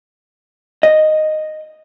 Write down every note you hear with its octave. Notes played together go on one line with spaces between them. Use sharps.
D#5